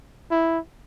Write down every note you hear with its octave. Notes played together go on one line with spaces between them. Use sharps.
E4